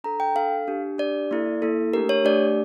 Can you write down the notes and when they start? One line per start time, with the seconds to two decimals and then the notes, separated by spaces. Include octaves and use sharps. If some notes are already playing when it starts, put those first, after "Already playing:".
0.04 D4 A4 A#5
0.20 G5
0.35 D4 A4 F5
0.68 D4 G4
0.98 D4 G4 D5
1.31 A#3 E4 A4
1.62 A#3 E4 A4
1.93 A3 D4 G4 A#4
2.09 C#5
2.25 A3 D4 G4 D5